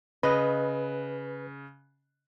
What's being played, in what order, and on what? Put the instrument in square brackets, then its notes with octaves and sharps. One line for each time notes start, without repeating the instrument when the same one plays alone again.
[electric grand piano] C#3 F#6 [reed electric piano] B4 [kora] D#5